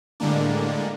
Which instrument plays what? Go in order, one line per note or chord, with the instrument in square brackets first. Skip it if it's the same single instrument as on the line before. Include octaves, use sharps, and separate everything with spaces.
[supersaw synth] A2 D3 G3 G#3 A#3 D4